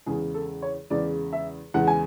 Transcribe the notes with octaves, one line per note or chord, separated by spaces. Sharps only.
E2 C#3 G#3 G#4
A4
C#5
E2 C#3 G#3 D5
E5
E2 C#3 G#3 F#5
G#5